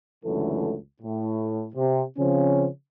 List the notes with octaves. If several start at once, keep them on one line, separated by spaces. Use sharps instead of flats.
C#2 F#2 D3 E3 A3 A4
A2
C3
C#3 F3 C4 C#4